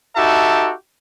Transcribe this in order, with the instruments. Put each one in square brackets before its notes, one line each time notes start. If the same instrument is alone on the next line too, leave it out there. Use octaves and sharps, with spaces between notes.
[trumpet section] D#4 F#4 G4 A4 E5 A5